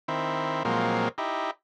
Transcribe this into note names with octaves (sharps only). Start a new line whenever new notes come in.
D#3 C4 E4
A#2 F3 F#3 G#3 A#3 C4
D#4 E4 G4